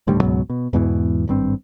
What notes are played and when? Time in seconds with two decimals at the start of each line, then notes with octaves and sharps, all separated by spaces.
0.07 D#1 D2 A2 G3
0.20 C#2 G#2 B2 F#3
0.50 B2
0.73 E2 G#2 B2 E3
1.28 G#1 G2 C4